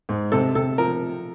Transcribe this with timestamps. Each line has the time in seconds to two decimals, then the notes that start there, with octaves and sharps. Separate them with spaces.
0.09 G#2
0.32 C3 A4
0.55 C3 A4
0.78 F3 A#4